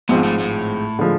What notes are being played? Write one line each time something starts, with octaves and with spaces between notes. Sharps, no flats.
G#1 G#2 B2 F3 G#3 C4
A2
A2
D3 F3 G#3